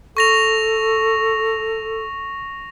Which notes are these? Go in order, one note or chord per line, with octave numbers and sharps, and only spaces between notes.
A4 C#6 A#6 F7